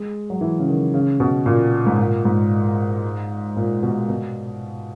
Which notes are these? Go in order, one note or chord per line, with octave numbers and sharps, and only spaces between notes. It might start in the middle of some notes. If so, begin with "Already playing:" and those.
Already playing: G#3
F#3
E3
C#3
D#3
C#3
B2
A#2
G#2
A#2
G#2
A#2
B2
B2